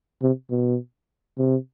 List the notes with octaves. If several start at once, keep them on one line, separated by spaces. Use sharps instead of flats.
C3
B2
C3